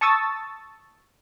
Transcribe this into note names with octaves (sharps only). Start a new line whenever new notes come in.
A5 C#6 D#6 E6 A6